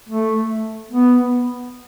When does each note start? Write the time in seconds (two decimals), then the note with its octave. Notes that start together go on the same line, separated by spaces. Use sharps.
0.09 A3
0.91 B3